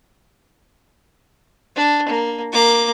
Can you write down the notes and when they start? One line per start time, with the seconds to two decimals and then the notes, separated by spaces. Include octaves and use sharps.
1.76 D4
2.08 A#3
2.53 A#3 D6